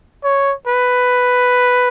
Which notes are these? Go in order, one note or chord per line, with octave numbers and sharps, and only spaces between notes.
C#5
B4